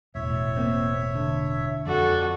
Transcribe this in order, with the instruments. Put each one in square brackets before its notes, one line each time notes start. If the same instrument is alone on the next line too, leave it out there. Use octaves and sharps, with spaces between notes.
[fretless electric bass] E1 A2 [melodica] C#5 E5
[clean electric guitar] A#3 C4
D3
[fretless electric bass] F2 [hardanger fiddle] F#4 A4 [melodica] D5